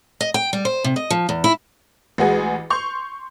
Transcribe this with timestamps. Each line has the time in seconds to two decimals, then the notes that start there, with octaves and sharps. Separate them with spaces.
0.21 D#5
0.34 G5
0.53 G3
0.65 C5
0.84 C3
0.96 D#5
1.10 F3
1.29 E2
1.44 E4
2.18 A1 G#3 F#4 G#4
2.70 C6 C#6 G6 F7